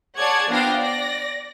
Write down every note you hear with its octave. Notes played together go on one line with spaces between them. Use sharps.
G#4 C#5 D5 F#5 A5 G#6
F3 B3 D4 F5 G5 A#6
D5 A#6